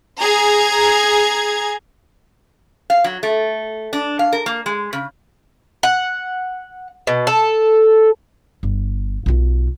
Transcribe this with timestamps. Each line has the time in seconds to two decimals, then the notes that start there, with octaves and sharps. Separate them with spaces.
0.20 G#4 A#5 G#6
2.90 F5
3.04 F#3
3.23 A3
3.93 D4
4.19 F5
4.33 A#4
4.46 A#3
4.66 G#3
4.93 C#3
5.83 F#5
7.07 B2
7.27 A4
8.63 G1
9.26 B1 F4